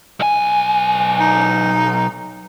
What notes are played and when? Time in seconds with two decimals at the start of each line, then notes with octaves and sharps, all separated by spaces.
0.20 B1 G#5
1.20 D#4